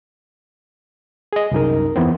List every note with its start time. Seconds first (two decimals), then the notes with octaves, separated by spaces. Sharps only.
1.33 G#4 D#5
1.51 C2 F#2 D#4 A#4
1.96 E2 E3 B3 C4